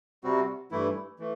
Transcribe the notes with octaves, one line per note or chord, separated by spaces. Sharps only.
C3 G3 C4 F#4
G2 E3 A3 E4
E3 A3